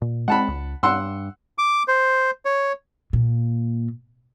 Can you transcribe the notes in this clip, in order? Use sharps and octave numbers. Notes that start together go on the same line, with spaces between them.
A#2
G#3 C4 F#5 A5 B5
C#2
G2 F#5 C6 E6
D6
C5
C#5
A#2